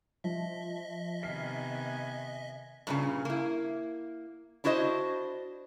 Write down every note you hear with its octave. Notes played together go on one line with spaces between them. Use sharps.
F3 D#5 E5
C3 D#3 B3 G#5 F6 B6 C7
G2 A#2 C#3
A#3 E4
D4 E4 F#4 C5 D#5